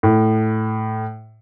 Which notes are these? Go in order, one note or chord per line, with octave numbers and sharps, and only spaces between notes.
A2